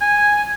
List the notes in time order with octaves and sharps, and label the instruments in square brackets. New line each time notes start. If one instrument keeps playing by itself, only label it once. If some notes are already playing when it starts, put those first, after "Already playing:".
[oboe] G#5